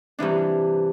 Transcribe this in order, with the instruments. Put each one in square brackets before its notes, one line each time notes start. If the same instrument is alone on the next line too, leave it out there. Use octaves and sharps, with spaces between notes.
[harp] G2 C3 E3 D4